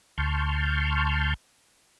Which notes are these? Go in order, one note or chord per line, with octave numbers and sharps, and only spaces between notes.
D2 A5 C6 C#6 F6 G6